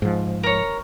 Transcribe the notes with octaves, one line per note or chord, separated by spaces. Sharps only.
G#2 F3
A#4 C#5